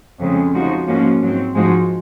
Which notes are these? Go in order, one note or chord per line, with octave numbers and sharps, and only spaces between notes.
F2 C#3 G#3
C#3 F3 G#3 D#4 F#4
G#2 F3 A#3 C#4 F#4
G#2 F#3 C4
G#2 F3 G#3 D#4 F#4